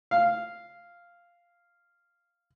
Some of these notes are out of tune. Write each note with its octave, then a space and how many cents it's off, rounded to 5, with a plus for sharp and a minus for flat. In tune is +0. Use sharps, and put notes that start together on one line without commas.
F5 -5